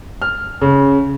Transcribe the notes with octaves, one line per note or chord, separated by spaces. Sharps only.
F6
C#3